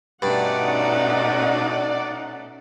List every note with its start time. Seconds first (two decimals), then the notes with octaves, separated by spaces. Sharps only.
0.22 G2 B2 A3 C#4 D#4 D5 F#5